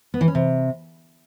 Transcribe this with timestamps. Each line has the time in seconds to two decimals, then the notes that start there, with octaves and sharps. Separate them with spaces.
0.14 B3
0.21 E3
0.28 C#4
0.35 C3